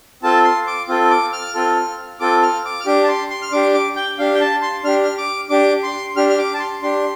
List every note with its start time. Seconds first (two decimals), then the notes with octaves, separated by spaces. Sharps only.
0.23 C4 F4 A4 A5
0.45 C6
0.67 D6
0.89 C4 F4 A4
1.11 D6
1.32 F6
1.54 C4 F4 A4
2.20 C4 F4 A4 D6
2.42 F6
2.65 D6
2.80 F6
2.86 D4 G4 D6
3.03 A5
3.08 C6
3.30 C6
3.42 F6
3.52 D4 G4 D6
3.74 D6
3.96 G5
4.19 D4 G4 F5
4.34 G5
4.41 A5
4.62 C6
4.84 D4 G4 F6
5.04 F6
5.18 D6
5.50 D4 G4 D6
5.83 C6
6.16 D4 G4 F6
6.29 F6
6.38 D6
6.54 A5
6.60 C6
6.82 D4 G4 C6